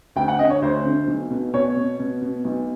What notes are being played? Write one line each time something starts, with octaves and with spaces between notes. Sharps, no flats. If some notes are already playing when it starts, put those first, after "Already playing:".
D2 G5
F#5
D3 D#5
C#5
D2 C5
D3
B1
B2
B2 C#5
B2
B2
B2
B1